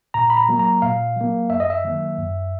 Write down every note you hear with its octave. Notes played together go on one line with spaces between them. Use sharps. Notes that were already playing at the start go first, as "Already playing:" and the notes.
A#2 A#5
B5
A#5
F#3 A#3
A#5
A#2 F5
F#3 A#3
F#2 E5
D#5
E5
D#3 F#3 A#3
F#2